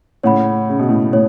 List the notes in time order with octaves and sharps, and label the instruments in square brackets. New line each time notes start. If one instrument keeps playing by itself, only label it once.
[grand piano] A2 C#3 [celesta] C#5 F#5 B5
[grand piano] C#3
B2
A2 C#3
[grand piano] A2 [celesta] C#5